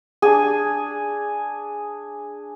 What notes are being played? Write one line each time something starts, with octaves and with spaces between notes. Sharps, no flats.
D4 G#4